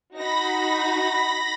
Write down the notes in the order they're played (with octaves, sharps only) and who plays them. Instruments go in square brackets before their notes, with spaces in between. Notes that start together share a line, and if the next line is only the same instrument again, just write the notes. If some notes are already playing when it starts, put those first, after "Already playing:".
[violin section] D#4 F#4 [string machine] B5 A#6